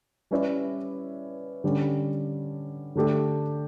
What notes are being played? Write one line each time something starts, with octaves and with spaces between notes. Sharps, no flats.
G3 C#4 E4 B4 D5
D3 G3 C#4
D3 A3 D4 G4